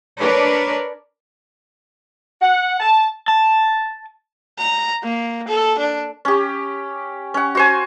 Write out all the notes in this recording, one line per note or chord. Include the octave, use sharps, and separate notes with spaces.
D4 A#4 B4 C#5 D5
F#5
A5
A5
A#5
A#3
A4
D4
C#4 G4
C#4 F#5
F#4 C5 G#5